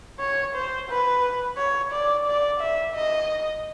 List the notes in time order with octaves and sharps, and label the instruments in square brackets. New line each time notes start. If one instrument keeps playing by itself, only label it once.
[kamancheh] C#5
C5
B4
C#5
D5
D5
E5
D#5